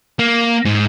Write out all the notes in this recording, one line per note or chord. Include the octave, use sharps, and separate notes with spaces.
A#3
G#2